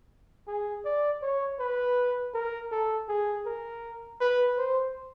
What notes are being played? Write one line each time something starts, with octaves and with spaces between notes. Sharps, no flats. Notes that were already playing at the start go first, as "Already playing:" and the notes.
G#4
D5
C#5
B4
A#4
A4
G#4
A#4
B4
C5